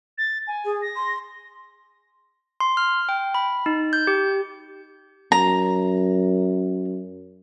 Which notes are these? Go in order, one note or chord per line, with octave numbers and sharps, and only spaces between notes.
A6
G#5
G#4
A#6
C6
C6
F6
G5
B5
D#4
G6
G4
F#2 A#5